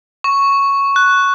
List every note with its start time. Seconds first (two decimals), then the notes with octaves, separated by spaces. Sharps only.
0.24 C#6
0.96 F#6